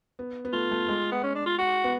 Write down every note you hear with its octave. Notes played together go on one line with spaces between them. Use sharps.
B3
B3
A3 F4
A3
G#3
B3
C#4
D4
F4
F#4
B3